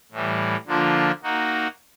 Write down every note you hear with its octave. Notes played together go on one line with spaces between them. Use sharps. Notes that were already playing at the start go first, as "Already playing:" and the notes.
A2 E3 G3
D3 F3 A#3 D4 F4
A#3 D#4 F#4